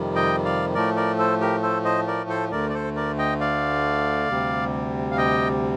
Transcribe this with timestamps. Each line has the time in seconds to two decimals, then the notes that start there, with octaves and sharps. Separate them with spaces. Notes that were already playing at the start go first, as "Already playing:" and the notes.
Already playing: F2 C3 D#3 G3
0.15 D#5 G5
0.45 D5 F5
0.74 A2 F3 A3 A#4 D5
0.96 A#4 D5
1.18 A4 C5
1.41 G4 A#4
1.62 A4 C5
1.85 C5 D#5
2.07 A#4 D5
2.29 A4 C5
2.51 D2 D3 A3 A#4 D5
2.70 D5
2.74 A4 C5
2.96 A#4 D5
3.18 D#5 G5
3.40 D5 F5
4.29 D2 C3 G3
5.11 F5
5.17 D#5 G5